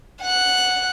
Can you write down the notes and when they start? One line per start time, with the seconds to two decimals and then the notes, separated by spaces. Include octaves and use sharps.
0.23 F#5 F#6